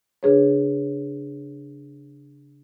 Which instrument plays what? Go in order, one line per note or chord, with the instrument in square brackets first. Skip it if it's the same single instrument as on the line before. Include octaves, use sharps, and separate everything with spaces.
[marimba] C#3 D4 G#4 B4 C#5